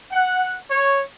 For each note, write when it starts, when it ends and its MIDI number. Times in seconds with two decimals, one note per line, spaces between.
0.11 0.57 78
0.69 1.02 73